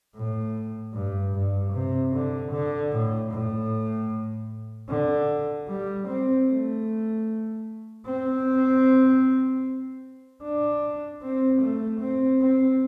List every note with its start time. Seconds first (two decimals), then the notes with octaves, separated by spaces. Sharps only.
0.15 A2
0.93 G2
1.34 G2
1.72 C3
2.13 D3
2.52 D3
2.92 A2
3.31 A2
4.88 D3
5.68 G3
6.07 C4
6.47 A3
8.05 C4
10.43 D4
11.22 C4
11.61 A3
12.00 C4
12.41 C4